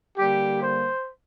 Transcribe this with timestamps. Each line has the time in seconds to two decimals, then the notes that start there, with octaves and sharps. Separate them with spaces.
0.17 D3 G3 A#3 G4
0.63 C5